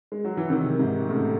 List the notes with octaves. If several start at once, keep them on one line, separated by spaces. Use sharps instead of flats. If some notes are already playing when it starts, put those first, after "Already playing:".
G#3
F#3
E3
C3 D#3
G#2 C3
A2 C#3